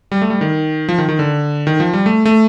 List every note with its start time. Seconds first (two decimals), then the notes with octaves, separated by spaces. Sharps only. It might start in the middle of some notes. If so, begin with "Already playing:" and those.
0.12 G3
0.22 A3
0.30 G3
0.41 D#3
0.89 F3
0.98 D#3
1.08 D#3
1.19 D3
1.67 D#3
1.80 F3
1.93 G3
2.06 A3
2.25 A3